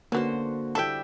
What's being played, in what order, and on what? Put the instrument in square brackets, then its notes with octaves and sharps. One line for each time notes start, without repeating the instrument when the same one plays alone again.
[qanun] D3 F#4 C5 [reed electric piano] A#3 [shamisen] B3 C#4
[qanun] G3 [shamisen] E4 A4 [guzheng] E5 G5